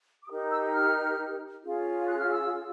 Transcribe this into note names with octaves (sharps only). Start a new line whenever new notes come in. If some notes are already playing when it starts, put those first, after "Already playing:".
D6
D#4 G4 A#4 D#6
E6
F6
C#4 F4 G#4
F#6
F6
E6